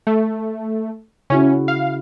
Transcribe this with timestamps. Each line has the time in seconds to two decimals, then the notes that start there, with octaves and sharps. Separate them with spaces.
0.07 A3
1.30 C#3 C#4 E4 F#4
1.68 F5